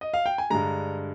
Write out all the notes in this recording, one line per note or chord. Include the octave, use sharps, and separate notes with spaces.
D#5
F5
G5
G#5
G2 D3 G#3 A#5